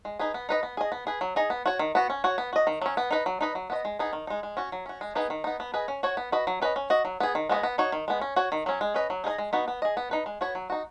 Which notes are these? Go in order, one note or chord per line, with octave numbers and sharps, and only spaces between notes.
G#3
D#4 G#4 B4
B3
D#4 B4 D#5
B3
G#4 D#5
B3
G#4 B4
F#3
D#4 G#4 D#5
B3
F#4 C#5
D#3
B3 F#4
C#4
F#4 C#5
B3
F#4 D#5
D#3
F#3 C#4
B3
D#4 B4 D#5
F#3
D#4 B4 D#5
F#3
B3 F#4 D#5
G#3
B3 D#4 G#4
D#3
G#3 D#4
G#3
C#4 F#4
F#3
C#4 F#4
G#3
B3 D#4 G#4 B4
D#3
B3 D#4
B3
G#4 B4 D#5
C#4
F#4 C#5
B3
F#4 B4 D#5
F#3
C#4 B4 D#5
C#4
F#4 D#5
F#3
B3 G#4
D#3
G#3 B3 F#4 D#5
B3
D#4 F#4 C#5
D#3
G#3 B3
C#4
F#4 C#5
D#3
F#3 C#4
G#3
C#4 B4 D#5
F#3
D#4 G#4 B4 D#5
G#3
B3 D#4 F#4
B3
G#4 D#5
B3
D#4 B4
G#3
B3 F#4 C#5
F#3
D#4 F#4